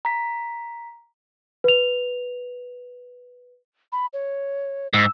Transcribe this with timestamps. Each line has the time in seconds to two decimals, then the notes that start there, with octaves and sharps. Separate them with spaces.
0.05 A#5 B6
1.64 B4 F7
3.92 B5
4.13 C#5
4.94 G#2 E6